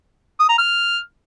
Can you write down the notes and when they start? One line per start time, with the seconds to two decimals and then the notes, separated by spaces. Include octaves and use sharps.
0.40 D#6
0.49 A#5
0.58 F6